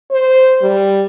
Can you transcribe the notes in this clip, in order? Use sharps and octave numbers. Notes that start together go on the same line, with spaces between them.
C5
G3